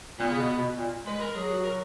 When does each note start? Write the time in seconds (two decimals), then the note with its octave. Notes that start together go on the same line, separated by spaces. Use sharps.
0.19 A#2 B3
0.31 C#3
0.39 B2
0.58 B2
0.78 A#2
1.06 G#3 B4
1.21 A#4
1.34 F#3 G#4
1.50 F#4
1.64 A#4